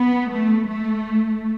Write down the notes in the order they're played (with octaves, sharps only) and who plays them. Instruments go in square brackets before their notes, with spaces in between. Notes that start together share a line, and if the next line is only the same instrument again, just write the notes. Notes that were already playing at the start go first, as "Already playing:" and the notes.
Already playing: [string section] B3
A3
A3